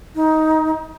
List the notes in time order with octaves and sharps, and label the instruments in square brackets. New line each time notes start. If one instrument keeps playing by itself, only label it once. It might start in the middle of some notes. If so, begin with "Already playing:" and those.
[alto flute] D#4